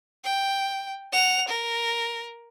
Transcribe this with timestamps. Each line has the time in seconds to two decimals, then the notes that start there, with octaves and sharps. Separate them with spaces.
0.24 G5
1.12 F#5 F7
1.48 A#4